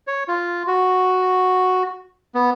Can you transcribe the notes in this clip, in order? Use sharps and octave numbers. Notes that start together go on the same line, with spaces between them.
C#5
F4
F#4
B3